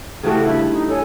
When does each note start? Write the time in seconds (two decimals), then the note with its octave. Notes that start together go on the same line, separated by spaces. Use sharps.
0.23 C#3 E3 A3 F#4 G4 G5
0.45 G2 E4 E5
0.67 D#4
0.89 A4 C#5 G#5